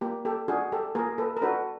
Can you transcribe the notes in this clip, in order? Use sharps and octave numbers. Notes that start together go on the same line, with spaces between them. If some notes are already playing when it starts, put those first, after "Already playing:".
A#3 G4
G4 A4
D4 F#4 G#4
G4 A4
A#3 G#4 A#4
A4 B4
A#4
D4 F#4 A4 B4